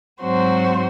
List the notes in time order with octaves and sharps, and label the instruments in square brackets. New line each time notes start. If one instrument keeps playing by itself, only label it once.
[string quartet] G#2 F#3 C4 F#4 C5